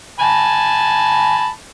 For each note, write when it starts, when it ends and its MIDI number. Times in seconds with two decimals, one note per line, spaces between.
0.20 1.48 80
0.20 1.48 81
0.20 1.48 83